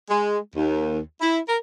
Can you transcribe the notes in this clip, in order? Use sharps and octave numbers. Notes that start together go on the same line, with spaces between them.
G#3
D#2
E4
A#4